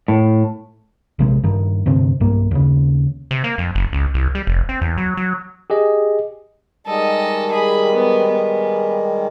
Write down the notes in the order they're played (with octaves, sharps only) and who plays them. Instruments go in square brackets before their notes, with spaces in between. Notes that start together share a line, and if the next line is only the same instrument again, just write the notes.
[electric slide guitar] A2
[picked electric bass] A#1 C3 G#3
G2 D#3
D2 G2 C3 C4
B1 G2 A#3
D#2 C#3
[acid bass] C3
A#3
F2
F#1
C#2
C2
G3
F1
C4
E2
F#3
F#3
[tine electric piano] G4 G#4 D#5
[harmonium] D#3 G3 G#3 [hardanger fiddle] A4 D#5
[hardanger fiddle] G#4 B5
B3
B3